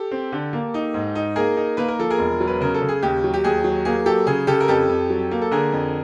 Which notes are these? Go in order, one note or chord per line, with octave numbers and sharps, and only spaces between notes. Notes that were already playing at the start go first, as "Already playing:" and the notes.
Already playing: G4 A4
C4
D3
A#3
D#4
G#2
D#4
A#3 G#4 A#4
D#4
A#3 B4
A#4
F3 A4
G#4 A#4
E1
F#3
B4
C#3 A#4
A4
C#3
G#4
D#2 G4
F#3
G4
D#2 G#4
F#3
A#3 G#4
F#3 G4 A4
C#3 G#4
C#3 G4 A4
A#4
F2 G4 A4
F2
F#3
A#3
A4
D3 G#4 A#4
F2